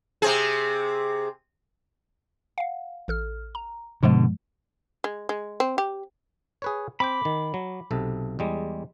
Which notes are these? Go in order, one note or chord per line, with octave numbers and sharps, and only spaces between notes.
C3 C4 G#4
F5 F#5
A1 A4 F6
A#5
G2 B2 D3 F3 G#3
G#3
G#3
C4
G4
G#4 B4 C#5
C4 G5 B5 D6
D#3
F#3
B1 C3 A4
E2 G3 G#3